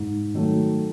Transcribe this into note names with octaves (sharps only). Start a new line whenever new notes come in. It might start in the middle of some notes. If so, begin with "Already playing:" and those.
Already playing: G#2
D#3 F#3 A3